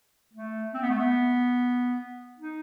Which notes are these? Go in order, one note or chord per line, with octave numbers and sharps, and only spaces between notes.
A3
C4
B3
A3
B3
D#4